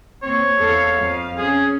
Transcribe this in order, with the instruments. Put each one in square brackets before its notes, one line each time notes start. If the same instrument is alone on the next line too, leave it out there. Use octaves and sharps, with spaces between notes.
[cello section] D#2 C4 [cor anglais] C#5
[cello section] E2 A4 F5
F2 F5
[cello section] C#4 [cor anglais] G#4